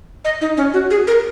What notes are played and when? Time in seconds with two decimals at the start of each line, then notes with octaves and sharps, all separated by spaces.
0.25 D#5
0.41 D#4
0.57 C#4
0.73 F#4
0.90 G#4
1.07 A#4